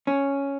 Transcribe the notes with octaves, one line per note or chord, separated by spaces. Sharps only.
C#4